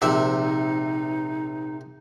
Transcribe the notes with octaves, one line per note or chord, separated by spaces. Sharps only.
A#1 C3 D#4 E5